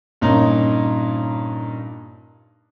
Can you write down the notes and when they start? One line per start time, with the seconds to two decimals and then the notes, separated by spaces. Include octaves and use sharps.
0.21 G2 A#2 C#4 D#4 A#5